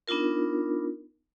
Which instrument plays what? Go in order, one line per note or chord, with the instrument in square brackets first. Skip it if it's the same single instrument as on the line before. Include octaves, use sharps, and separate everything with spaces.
[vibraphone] B3 D4 D#4 F4 A#4